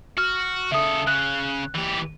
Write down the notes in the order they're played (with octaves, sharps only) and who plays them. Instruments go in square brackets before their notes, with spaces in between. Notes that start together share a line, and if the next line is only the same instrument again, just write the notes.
[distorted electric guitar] F#4 [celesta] F6
[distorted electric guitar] C#3 A4 [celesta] E5 D#6
[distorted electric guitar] C#3 [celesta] F#6
[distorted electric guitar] E3 G4